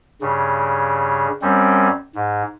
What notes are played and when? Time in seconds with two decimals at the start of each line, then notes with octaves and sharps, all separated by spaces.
0.21 G2 C#3
1.42 F#2 G3 C4 C#4
2.15 G#2